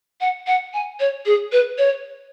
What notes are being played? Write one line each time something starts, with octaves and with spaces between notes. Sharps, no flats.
F#5
F#5
G#5
C#5
G#4
B4
C#5